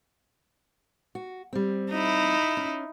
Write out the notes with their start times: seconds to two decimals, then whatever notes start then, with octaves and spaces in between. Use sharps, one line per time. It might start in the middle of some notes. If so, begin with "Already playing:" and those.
1.15 F#4
1.53 G3 C4
1.91 D#4 E4
2.57 C#4